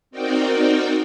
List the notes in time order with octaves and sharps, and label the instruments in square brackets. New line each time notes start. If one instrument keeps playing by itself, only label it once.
[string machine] C4 D#4 F#4 A#4 D5 G5